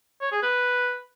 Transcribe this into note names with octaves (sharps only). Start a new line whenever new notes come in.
C#5
G#4
B4